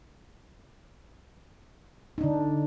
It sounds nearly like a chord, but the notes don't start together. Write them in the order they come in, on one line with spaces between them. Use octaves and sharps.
D#4 D4 D3